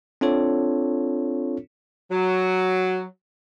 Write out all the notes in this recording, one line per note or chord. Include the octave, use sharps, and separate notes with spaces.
C4 D4 F4 A4 C#5
F#3